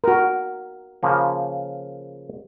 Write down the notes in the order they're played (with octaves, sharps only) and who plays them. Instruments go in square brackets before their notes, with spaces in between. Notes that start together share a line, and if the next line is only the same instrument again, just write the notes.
[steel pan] F#4 A#4
[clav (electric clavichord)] C#3 F3 A#3